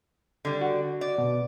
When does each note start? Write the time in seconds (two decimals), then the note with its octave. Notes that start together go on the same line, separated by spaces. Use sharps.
0.45 D3 G3
0.61 F#4
1.01 D5
1.18 B2